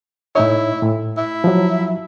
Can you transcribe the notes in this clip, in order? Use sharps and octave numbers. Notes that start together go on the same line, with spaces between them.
A2 D#4 E4 C#5
A2
E4
F3 F#3